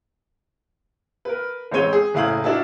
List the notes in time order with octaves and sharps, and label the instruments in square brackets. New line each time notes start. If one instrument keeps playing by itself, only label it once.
[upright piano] A#4 B4
A1 G#3 C4 C#5 D#7 G7
G#4
F#1 A2 E4 F5 D#6 F#7
D4 E4 F#4 A#4 E5 A5